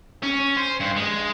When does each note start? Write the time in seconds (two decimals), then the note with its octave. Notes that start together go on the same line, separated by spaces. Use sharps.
0.23 C#4
0.57 C5
0.80 G2
0.96 G#3